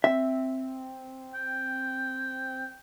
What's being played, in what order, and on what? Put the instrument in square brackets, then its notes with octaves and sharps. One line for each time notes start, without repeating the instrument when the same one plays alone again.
[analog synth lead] C4 [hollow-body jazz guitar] E5
[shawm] G5